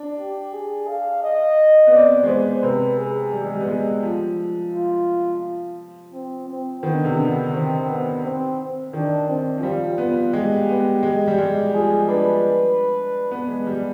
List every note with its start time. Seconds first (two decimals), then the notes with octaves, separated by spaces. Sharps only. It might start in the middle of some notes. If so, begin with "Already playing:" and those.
Already playing: D4
0.18 G4
0.53 G#4
0.88 F5
1.23 D#5
1.87 B3
1.93 C4 D5
2.23 G#3
2.28 B3 C5
2.63 C3 B4
2.98 G#4
3.32 G3
3.44 G#3
3.54 G3
3.60 B3
3.68 G#3
4.03 F3
4.73 F4
6.13 C4
6.48 C4
6.83 D#3 B3
6.94 D3
7.04 C3
7.14 D3
7.53 D#3 C4
7.88 B3
8.23 C4
8.93 D#3 D4
9.28 C4
9.58 F3
9.63 G3 F4
9.98 B3
10.33 G#3 G4
10.69 B3
11.03 G#3
11.27 G3
11.38 G#3
11.73 F3 G#4
12.08 D4 B4
13.31 B3
13.48 G#3
13.67 G3